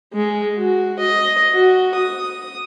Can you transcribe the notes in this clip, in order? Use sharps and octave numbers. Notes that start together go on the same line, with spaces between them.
G#3
F#4
D#5
F#4
D#6